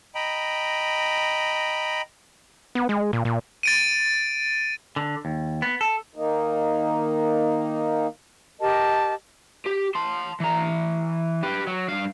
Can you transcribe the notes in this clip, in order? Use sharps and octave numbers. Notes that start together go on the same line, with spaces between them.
D#5 G5 A#5 B5
B3
G#3
A#2
A#2
A6 D7 D#7
D3
D#2
B3
A4
D#3 A#3 D#4
G4 A#4 D#5 A5
G4
A5 C6
E3 A#5
G4 B4
F#3
G2 F5